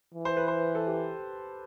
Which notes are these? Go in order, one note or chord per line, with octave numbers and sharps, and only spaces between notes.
E3
C5
B4
C5
A4
G4